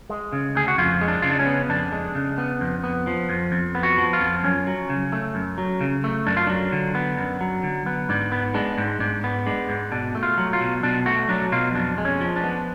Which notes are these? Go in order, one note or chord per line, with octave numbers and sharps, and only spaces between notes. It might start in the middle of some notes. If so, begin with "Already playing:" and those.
G#3
C#3
D2 G#4
F#4
F2 F4
G#3
D4
C#3 F4
D4
C#4
B3
F2 D4
G#3
C#3
B3
F2
B3
F3
F2
F2
B3
F#4
F3
F4
F2
F#2 C#4
F#3
C#3
A3
F#2
F#3
C#3
A3
F#2 D4
F4
F#3 D4
D3
B3
F#2
F#3
D3
B3
G#2 D4
B3
G#3 D4
G#2
G#2 D4
B3
G#3 D4
G#2
B2 D4
A3
F4
F#3
F4
B2
B2 D4
A3 F#4
F#3 D4
B2 F4
F2 D4
G#3
C#4
F3
D4
B3